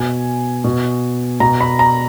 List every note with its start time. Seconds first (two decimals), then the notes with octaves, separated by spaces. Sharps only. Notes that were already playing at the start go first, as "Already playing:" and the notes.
Already playing: B2 G#5
0.64 B2
1.40 B2 A#5
1.61 B5
1.79 A#5